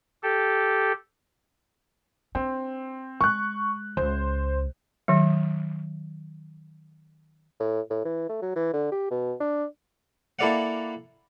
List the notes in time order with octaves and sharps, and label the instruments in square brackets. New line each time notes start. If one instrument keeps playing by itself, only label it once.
[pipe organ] G4 A4
[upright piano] C4 [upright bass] D4
[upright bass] G#3 [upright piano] C#6 F#6
[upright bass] C#2 [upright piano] C5
[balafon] D#3 F#3
[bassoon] A2
A2
E3
A3
F#3
E3
D3
G4
B2
D4
[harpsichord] A#3 E4 A4 D5 F5 F#5